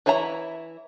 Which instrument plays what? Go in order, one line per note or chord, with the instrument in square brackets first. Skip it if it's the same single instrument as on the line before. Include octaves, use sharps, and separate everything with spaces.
[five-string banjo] E3 E4 C#5 E5 A#5